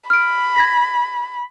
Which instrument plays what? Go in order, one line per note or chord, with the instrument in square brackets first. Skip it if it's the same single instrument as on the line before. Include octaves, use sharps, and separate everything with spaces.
[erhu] B5 [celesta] F6 D7
[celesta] G#6 A#6 B6